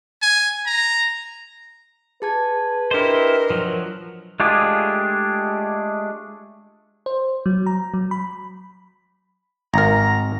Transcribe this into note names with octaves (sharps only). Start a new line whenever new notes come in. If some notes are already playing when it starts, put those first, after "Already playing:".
G#5
A#5
G#4 B4 A5 G#6
D4 E4 G4 A#4 C5 D#5
F3 F#3
G#3 A3 D4 F4 G4 G#4
C5
F#3
A#5
F#3
B5
G#1 A#4 A#5